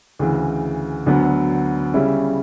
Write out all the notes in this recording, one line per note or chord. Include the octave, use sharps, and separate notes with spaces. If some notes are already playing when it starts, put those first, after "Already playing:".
D2 C#3 E3
D2 D3 F#3 B3
C#3 G3 C#4 E4